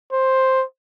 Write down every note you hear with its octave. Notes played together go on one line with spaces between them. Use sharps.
C5